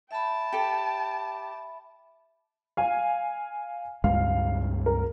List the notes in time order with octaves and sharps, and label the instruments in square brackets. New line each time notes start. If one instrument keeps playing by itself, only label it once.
[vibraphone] E5 B5 [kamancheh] G5 A5
[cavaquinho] G4 A4
[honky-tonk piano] F5 G#5
[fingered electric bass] C#2 G2 G#3 [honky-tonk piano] F5
[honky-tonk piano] A#4